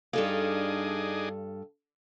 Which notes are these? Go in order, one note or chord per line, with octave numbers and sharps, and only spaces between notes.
G2 D4 D#4 G#4 A4 F5